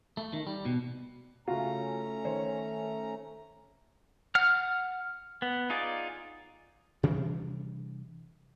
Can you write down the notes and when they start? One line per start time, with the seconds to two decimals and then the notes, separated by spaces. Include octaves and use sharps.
0.17 A3
0.33 D#3
0.47 G3
0.66 B2
1.48 C#3 A3 C#4 F4 F#4 A#5
2.25 D#3 C5 C#5
4.35 F#5 F6
5.42 B3
5.70 D#4 F4 G#4 D5
7.03 C3 E3 G3 D4